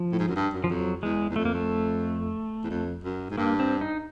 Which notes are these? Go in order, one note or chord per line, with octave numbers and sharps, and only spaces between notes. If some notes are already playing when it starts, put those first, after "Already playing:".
Already playing: F3
A2
G#2
F#2
G2
F#2
F3
F2 F#3
E2 G#3
E2
F2 A3
A#3
A3
E2
F2
F#2
G#2
G2 A#3
C4
D#4